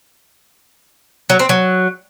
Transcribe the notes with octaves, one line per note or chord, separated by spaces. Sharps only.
F#3
C4
F#3